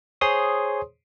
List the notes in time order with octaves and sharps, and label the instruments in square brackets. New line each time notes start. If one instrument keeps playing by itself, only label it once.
[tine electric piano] G#4 C5 C#5 C6 D#6